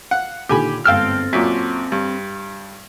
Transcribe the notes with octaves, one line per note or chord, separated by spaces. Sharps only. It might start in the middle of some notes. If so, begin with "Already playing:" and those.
F5 F#5
A#2 D3 D#3 G4 G#5 B5
G1 G#2 C4 A4 F5 G5 E6 F6
F#2 A#2 C#6 D6 B6
G2